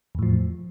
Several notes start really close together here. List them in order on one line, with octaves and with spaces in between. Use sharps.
E2 A2 F3